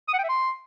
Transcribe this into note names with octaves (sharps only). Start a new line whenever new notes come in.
D#6
F#5
G5
E5
C6